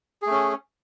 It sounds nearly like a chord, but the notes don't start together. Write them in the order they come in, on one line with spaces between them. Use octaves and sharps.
G#4 A3 C#4